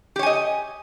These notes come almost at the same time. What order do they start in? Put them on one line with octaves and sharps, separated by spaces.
G4 C#5 G#5 D#5